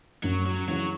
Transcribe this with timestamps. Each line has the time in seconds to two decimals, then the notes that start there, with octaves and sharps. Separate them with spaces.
0.23 F#2 F#3
0.46 F#3
0.68 C#3 E3 F#3 C#4